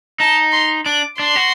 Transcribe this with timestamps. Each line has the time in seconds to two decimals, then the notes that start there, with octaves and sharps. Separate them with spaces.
0.20 D#4 A5
0.52 C6
0.86 D4 D6
1.19 D4 C6
1.36 F#4